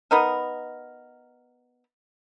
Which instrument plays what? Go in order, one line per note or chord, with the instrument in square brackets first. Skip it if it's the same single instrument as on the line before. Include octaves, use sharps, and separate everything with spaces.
[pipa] B3 D#4 A#4